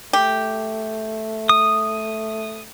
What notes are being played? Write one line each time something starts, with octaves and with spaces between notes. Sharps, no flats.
A3 G4
D#6